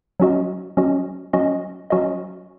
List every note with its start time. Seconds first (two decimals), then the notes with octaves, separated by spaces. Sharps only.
0.20 F#3 C#4 F#4 D#5
0.77 F#3 C#4 F#4 D#5
1.33 F#3 C#4 F#4 D#5
1.90 F#3 C#4 F#4 D#5